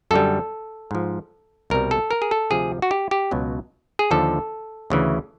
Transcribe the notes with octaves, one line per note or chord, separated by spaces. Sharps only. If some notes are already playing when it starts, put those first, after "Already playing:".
F#2 D3 G3 A4
G#2 F3
C2 B2 G3 A#4
A4
A#4
G#4
A4
D2 C3 F3 G#4
F#4
G4
G4
C#2 B2 F#3
G#4
D#2 D3 F3 A4
D2 C#3 E3